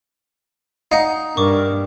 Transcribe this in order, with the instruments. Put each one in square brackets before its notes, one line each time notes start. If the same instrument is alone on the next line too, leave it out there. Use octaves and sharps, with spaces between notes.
[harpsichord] D#4 [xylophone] F5 F#5
[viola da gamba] G2 [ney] A#4 [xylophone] C#6 D6